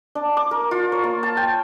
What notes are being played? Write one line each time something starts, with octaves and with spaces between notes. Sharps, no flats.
D4
D6
A#4
F4
C#5
A#3
A5
G5